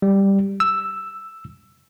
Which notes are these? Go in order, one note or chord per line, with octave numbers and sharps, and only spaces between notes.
G3
E6